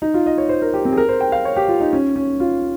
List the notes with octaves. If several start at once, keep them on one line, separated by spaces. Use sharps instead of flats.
D#4
F4
D#5
C#5
C5
A#4
G4
C4
G#4
A#4
C5
G5
F5
C#5
G4
F4
D#4
C#4
C#4
F4